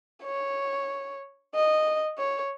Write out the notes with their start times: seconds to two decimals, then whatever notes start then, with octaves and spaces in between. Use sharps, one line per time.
0.23 C#5
1.54 D#5
2.19 C#5